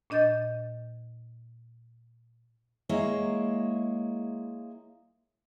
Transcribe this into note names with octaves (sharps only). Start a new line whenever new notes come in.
A#2 D4 D#5 G6 A6
G#3 A#3 E4 C#5